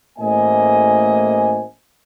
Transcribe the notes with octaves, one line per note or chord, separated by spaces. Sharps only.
A1 A2 A#3 C5 D#5 G#5